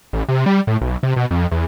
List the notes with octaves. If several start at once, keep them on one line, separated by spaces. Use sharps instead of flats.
A1
C3
G3
A2
B1
C3
B2
F2
E2